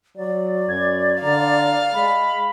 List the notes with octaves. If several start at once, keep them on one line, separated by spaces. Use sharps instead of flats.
F#3 D5
F#2 G#6
D3 F5 A#5
G#3 B5